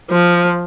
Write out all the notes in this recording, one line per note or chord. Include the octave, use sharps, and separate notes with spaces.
F3